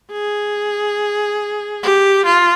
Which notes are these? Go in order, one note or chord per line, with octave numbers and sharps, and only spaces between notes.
G#4
G4
F4